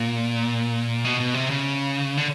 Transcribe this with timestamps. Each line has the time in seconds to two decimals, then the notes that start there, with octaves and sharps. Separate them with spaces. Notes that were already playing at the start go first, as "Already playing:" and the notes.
Already playing: A#2
1.05 B2
1.20 B2
1.34 C3
1.50 C#3
2.17 D3